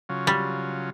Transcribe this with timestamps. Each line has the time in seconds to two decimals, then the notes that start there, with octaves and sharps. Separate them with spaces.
0.09 C#3 F#3 F4
0.27 G3